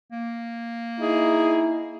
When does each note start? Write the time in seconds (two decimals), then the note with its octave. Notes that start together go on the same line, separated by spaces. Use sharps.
0.12 A#3
1.00 D#4 E4 G#4